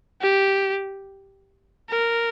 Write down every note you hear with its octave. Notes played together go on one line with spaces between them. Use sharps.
G4
A#4